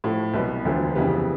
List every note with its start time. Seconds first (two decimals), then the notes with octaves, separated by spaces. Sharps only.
0.04 A2 F3 A3
0.34 C2 B2 F#3 B3
0.65 E1 D2 D3 F3
0.95 F2 C#3 E3 G3 B3